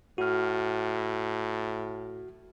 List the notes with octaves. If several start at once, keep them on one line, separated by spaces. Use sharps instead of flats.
A2 F#4 F6